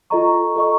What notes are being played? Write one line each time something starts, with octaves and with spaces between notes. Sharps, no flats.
F4 A4 D#5 A#5 C#6
F4 A4 D#5 A#5 C#6